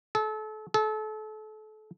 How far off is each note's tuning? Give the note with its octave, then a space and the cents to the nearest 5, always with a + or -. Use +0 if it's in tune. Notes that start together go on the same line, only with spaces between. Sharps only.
A4 -35
A4 -35